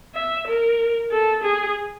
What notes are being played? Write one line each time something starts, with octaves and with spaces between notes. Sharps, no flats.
E5
A#4
A4
G#4